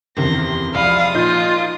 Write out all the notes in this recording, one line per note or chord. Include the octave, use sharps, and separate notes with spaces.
F#1 E2 C3 D#3 C6 A#6
C2 F3 G#3 F5 B5 D#6
A#2 D#4 F4 G6